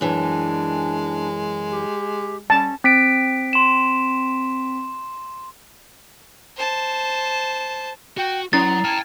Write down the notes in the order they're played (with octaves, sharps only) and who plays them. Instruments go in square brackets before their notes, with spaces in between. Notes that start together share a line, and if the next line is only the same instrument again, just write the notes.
[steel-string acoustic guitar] F#2 E3 [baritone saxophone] G#3 [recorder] D4
[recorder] G4
[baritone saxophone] G3 [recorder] C#4 [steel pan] A5
[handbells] C4 B6 D7
[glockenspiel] C6 E7
[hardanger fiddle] C5 A5
[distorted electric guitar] F#4 [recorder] G5
[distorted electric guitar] F#3 [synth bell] C#4 E4 C7 [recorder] A#5 [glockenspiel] A6
[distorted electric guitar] G5 A5 [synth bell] F6 G#6